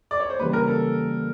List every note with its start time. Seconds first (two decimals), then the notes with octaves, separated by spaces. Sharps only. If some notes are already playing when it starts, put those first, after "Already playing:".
0.11 D5
0.20 C#5
0.30 C5
0.39 C#3 E3 G3 A#3 B4
0.53 A#4
0.68 A4